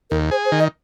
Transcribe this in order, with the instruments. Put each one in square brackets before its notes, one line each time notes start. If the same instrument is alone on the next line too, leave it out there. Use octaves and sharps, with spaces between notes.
[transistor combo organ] D#2 [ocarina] A#4
[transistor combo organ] G#4 [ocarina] C5
[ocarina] C5
[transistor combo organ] D#3
[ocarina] D#5